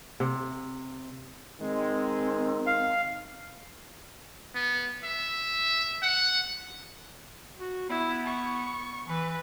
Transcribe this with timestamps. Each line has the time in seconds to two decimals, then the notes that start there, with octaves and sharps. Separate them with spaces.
0.20 C3
1.61 D#3 G#3 C4
2.66 F5
4.55 B3
5.04 E5
6.03 F#5
7.60 F#4
7.90 B3 E4
8.27 C#6
9.08 E3 B4